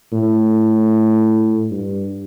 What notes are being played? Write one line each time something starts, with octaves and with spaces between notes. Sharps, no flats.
A2
G2